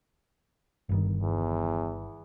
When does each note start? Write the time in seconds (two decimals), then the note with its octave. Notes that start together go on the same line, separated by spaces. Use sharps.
0.89 G1 G2 D#3
1.23 E2